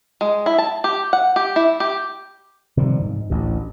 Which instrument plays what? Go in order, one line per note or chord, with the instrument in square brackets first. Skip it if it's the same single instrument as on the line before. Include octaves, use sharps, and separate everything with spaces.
[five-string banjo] G#3
E4
A5
G4
F#5
G4
E4
G4
[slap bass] C3 D#3 F3 G3
G#2
A1 D2